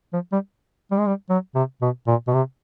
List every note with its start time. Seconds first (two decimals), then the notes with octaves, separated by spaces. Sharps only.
0.13 F3
0.32 G3
0.91 G3
0.99 G#3
1.06 G3
1.30 F#3
1.55 C3
1.82 B2
2.07 A#2
2.27 B2
2.33 C3